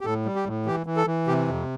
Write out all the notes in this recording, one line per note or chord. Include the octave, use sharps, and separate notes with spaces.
G4
A2 A4
G3
G4
A2
E3 G4
E3
A4
E3
C3 G4
F2